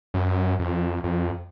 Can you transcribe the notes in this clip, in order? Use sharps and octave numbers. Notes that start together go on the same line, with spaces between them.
F#2
F2
F2